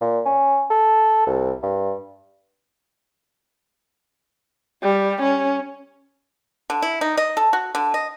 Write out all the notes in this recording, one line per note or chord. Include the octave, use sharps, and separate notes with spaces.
A#2
C#4
A4
C2
G2
G3
C#4
D3
E4
D#4
D#5
A4
F#4
D3
D#5